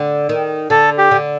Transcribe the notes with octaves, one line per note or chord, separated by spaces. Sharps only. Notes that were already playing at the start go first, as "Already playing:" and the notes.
Already playing: D3
D#3
D3 A4
G4
D3